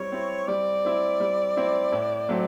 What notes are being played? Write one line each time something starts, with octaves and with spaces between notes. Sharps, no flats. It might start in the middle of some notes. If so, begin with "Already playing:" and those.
Already playing: G3 C4 E4 C#5
C4 E4
G3 D5
C4 E4
G3
C4 E4
A2
F#3 A3 C4